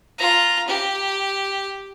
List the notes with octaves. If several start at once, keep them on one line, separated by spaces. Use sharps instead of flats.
F4 A#5
G4